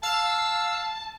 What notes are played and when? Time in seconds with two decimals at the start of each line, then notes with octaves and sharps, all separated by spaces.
0.03 F5 A5 E6